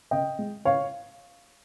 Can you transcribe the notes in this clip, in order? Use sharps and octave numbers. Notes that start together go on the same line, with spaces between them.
C#3 D#5 G5
G#3
C#3 C#5 F5